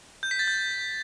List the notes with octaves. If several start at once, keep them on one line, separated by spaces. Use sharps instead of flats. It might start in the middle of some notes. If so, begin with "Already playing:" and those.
G6
B6
A6
G6